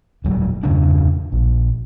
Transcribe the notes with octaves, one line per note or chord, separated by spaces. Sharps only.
D#1 F#3 G3
E2 G2 C#3 D4
A#1